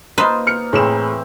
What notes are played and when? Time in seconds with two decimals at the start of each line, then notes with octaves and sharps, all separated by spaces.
0.18 A#3 D#4 F4 B4 C5
0.47 F6 C#7
0.73 A2 E3 C4 G#4 E7